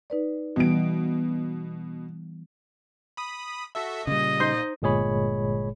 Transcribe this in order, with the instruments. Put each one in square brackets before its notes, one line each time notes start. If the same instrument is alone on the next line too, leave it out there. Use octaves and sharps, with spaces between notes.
[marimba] D#4 B4 D5
[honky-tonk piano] B2 D7 [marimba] E3 G3 B3
[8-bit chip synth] B5 D#6
F#4 A4 E5
[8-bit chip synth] A#2 [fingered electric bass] C#3 G3 [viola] D#5
[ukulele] D#4 C5
[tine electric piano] G1 A#2 G#3 G#4 C#5 B5